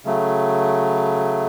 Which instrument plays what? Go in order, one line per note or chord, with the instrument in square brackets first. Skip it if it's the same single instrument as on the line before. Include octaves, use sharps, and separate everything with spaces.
[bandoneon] C#3 F#3 A3